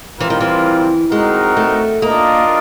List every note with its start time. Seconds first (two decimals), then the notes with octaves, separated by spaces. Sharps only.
0.20 E3 G3 C4 F4 A#4
0.30 D#3
0.41 E3
1.11 G#3 C4 D#4 F#4 A#4
1.57 A3
2.02 A#3 D4 F4 A#4 D#5